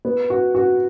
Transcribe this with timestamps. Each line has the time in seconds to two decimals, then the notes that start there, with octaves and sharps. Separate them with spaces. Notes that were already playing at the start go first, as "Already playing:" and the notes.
0.05 B3
0.30 F#4
0.55 F#4